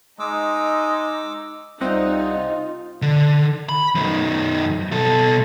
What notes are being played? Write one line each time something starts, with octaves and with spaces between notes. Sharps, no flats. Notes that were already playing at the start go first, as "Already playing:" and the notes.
G#3 D#4 D6 E6
C2 C3 G3 C4 D#4 F4 D#5 F#5
D3
B5
F#2 D#3
B2 A4